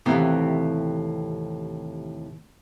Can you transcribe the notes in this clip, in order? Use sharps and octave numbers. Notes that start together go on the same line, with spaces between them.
D#2 A2 C3 E3 B3